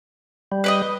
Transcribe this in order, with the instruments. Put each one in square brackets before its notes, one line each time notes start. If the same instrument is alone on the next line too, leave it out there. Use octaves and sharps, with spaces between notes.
[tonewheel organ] G3
[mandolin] B4 D5 D#5